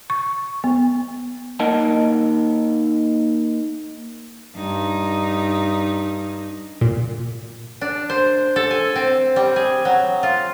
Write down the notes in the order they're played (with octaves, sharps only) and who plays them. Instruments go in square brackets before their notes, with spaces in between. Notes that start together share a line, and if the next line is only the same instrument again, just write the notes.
[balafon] C#6
B3
[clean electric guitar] A#3 D#4 A#4 D#5 F#5 A5
[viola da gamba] G2 D#4
[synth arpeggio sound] A#2
[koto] D4
C5
A4
G#5
C4
G3
G#4
F#3
F4